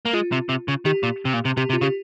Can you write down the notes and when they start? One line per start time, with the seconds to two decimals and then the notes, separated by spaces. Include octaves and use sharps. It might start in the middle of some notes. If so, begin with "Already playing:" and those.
0.05 A#3
0.13 G#3 F4
0.32 C3
0.49 C3
0.68 C#3
0.85 D#3 G4
1.03 A#2
1.25 C3
1.33 A#2
1.45 C3
1.57 C3 G4
1.70 C3
1.73 F4
1.81 C#3 G4